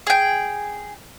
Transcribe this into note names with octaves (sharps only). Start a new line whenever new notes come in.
G#4 G5